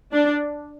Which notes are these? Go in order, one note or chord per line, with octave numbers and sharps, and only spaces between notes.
D4